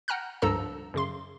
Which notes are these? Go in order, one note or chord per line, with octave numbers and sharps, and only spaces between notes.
F#5 G5 A#5 F6 F#6
C#2 G2 F3 A4 A#5 E6
F#2 C#3 C6